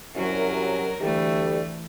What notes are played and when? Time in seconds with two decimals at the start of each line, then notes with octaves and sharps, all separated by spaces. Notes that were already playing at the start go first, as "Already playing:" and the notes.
0.15 C2 F#2 F#3 A#4
1.00 D2 E3 G3 A3